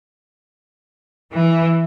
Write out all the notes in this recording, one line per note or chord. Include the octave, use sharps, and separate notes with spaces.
E3